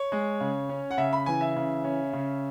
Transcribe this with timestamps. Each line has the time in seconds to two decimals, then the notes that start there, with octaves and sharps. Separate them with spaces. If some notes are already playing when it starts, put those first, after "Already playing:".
Already playing: C#5
0.12 G#3
0.40 C#3
0.69 C#4
0.91 F#5
0.97 C#3 E5
1.13 B5
1.26 E3 G#5
1.41 E5
1.56 C#3
1.84 C#4
2.13 C#3